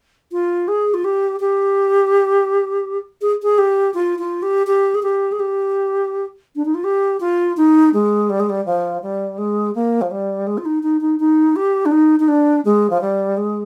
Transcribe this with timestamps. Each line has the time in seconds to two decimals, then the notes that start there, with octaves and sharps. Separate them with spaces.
0.32 F4
0.68 G#4
0.94 F4
1.04 G4
1.40 G4
3.22 G#4
3.43 G#4
3.58 G4
3.94 F4
4.19 F4
4.42 G4
4.67 G4
4.95 G#4
5.03 G4
5.32 G#4
5.40 G4
6.56 D4
6.65 D#4
6.75 F4
6.84 G4
7.20 F4
7.57 D#4
7.94 G#3
8.30 G3
8.40 G#3
8.50 G3
8.66 F3
9.02 G3
9.38 G#3
9.75 A#3
10.02 F3
10.11 G3
10.47 G#3
10.58 F4
10.65 D#4
10.83 D#4
11.01 D#4
11.20 D#4
11.56 G4
11.86 D4
11.92 D#4
12.20 D#4
12.28 D4
12.65 G#3
12.90 F3
13.01 G3
13.37 G#3